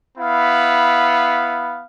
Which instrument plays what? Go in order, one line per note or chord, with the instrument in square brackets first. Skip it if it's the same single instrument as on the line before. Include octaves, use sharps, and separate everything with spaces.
[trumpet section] B3 E4 F5 B5